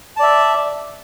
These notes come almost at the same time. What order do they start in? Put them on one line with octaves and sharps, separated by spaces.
A5 D5 E5